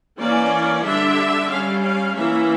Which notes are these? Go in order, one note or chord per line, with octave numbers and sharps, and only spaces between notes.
E3 A#3 C#4 D5
D3 G3 D4 E5
G3 C#4 F5
F5
E3 A#3 C#4 E5